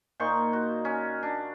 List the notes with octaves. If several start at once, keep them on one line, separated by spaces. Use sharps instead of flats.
A#2 D#4 C5 C#6
F#4
C#4
D4